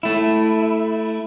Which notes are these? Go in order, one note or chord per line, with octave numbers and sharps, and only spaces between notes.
A3 E4